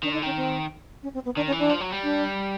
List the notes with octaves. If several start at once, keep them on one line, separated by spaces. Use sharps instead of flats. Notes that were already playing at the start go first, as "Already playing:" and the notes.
D#3 D4
D3 D#4
D#3 C#4
C4
C#4
C4
B3
D#3 D4
C#4
E3
D4
F3
F#3
G3
D4